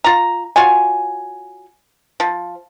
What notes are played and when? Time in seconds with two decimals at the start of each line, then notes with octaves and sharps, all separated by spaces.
0.04 F4 A#5
0.56 F4 F#4 C#5 G#5
2.20 F3